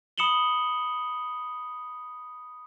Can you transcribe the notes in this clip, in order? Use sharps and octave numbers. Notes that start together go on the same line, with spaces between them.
B5 D#6 C#7 E7 F#7 G7